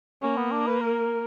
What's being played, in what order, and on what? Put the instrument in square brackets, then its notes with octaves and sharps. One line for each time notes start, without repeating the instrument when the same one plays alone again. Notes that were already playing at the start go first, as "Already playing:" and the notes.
[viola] A#3 [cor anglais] C#4
[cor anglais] B3
D4
B4
A#4